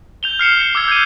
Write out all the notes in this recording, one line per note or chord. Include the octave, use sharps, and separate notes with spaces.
G6 F7 G7
F6 C7 C#7 E7
C7
D6 E6 G#6
G6 G#6 D#7